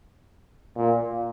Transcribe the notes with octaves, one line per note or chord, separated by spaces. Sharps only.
A#2